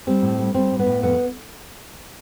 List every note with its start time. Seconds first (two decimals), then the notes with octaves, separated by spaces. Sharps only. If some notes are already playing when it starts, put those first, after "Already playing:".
0.07 G3 C4
0.22 A2
0.39 G3
0.55 G3 C4
0.71 A2
0.79 B3
0.86 A2
1.03 F2 B3